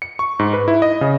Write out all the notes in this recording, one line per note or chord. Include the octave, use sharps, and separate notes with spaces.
C#7
C#6
G#2
B4
E4
D#5
C#3